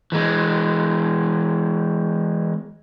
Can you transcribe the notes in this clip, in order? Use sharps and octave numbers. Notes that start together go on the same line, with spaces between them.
E3 G#3